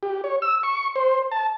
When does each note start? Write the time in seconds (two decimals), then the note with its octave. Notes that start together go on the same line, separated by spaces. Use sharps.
0.03 G4
0.24 C#5
0.42 E6
0.63 C#6
0.96 C5
1.31 A5